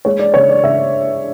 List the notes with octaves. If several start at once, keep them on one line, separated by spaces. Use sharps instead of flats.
G#3 C#5
D5
C#3 C#5
D5
C#3 E5